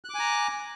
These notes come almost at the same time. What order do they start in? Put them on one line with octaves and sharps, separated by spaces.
F#6 D6 G#5 A#5